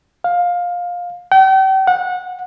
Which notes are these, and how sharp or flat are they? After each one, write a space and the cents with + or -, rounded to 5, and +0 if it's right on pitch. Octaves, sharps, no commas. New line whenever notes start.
F5 +15
G5 -40
F#5 -25